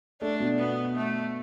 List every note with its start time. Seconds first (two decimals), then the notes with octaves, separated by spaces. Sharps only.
0.22 A3 D4
0.40 B2
0.59 B3
0.96 A3